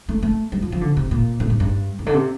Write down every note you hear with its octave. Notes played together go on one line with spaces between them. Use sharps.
A3
A3
G3
F3
F3
D3
C3
A#2
A2
G2
G2
A2
D3
C3